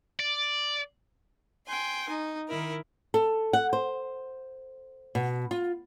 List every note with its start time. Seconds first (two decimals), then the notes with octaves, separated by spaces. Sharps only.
0.19 D5
1.66 G5 G#5 C6
2.09 D#4
2.48 D#3 E4 A#4
3.14 A4
3.53 F#5
3.73 C5
5.15 B2
5.51 F4